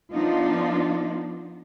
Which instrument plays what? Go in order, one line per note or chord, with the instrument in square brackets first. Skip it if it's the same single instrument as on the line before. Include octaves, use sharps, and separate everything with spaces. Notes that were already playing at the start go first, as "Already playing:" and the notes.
[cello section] F3 B3 D4 D#4 F4